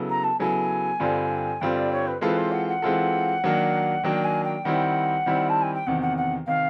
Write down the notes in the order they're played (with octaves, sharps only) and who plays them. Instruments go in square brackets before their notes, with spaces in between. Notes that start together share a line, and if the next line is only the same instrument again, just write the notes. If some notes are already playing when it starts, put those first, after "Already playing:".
Already playing: [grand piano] C#3 F#3 B3 E4 A4
[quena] A#5
A5
[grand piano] C#3 F#3 B3 E4 A4 [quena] G#5
[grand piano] G2 D3 G3 C4 F4
[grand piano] G2 D3 G3 C4 F4 [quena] G5
[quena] D5
C#5
B4
[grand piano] E3 G#3 C4 F4 A4 [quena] B4
[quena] C5
F#5
F#5
[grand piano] E3 G#3 C4 F4 A4
D#3 F#3 A#3 D4
[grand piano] D#3 F#3 A#3 D4 [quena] G5
[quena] G#5
G5
[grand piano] D#3 G3 C4 E4 [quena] F#5
[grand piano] D#3 G3 C4 E4
[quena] A5
G#5
G5
[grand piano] E2 C3 D#3 [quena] F#5
[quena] F#5
F#5
[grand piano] C3 D#3 [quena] F5